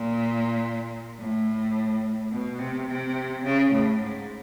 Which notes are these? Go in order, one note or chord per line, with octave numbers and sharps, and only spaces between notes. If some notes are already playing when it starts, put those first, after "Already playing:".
Already playing: A#2
A2
B2
C3
C3
C#3
A2
G#2